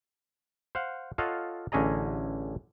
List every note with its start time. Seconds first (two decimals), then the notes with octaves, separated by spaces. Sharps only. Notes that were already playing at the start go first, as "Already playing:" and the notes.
0.75 C5 F5 F#5
1.18 F4 A4 C#5 D#5 F5 F#5
1.72 A1 D3 C#4 G#4 D#5 A#5